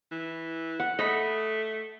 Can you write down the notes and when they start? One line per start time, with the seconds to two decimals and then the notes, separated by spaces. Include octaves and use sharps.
0.12 E3
0.80 F#5
0.99 A3 D#5 B5